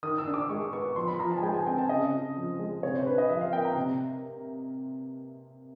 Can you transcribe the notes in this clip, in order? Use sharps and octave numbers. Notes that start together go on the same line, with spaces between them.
D#3 D#6
E6
D4
D6
G#3 C#6
B3 C#6
F3 C6
B5
F3 A#5
A5
G#5
G#3 G5
G#5
C4 G5
A5
C#3 D#5
C#3
F3
G#3
C3 C#5
C5
D4 B4
D#5
F3 E5
F5
A#3 G5
A#5
C3